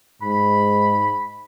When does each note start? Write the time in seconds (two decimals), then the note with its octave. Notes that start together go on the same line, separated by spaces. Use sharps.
0.22 G#2 B5